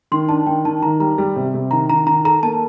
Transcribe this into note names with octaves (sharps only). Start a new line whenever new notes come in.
D#3 C6
D4 A5
D#3 G5
D#3 A5
D#3 A#5
G3 A#5
G3
C3
C3
D#3 A#5
D#3 A#5
D#3 A#5
A4 A#5
A#3 A5